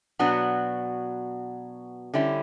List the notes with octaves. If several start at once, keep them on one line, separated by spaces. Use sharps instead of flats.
B2 F#3 B3 D4 F#4
D3 G3 C#4 E4